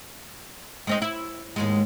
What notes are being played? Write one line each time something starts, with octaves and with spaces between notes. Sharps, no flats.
G#3 C4 D#4
E4
D#2 G#2 G#3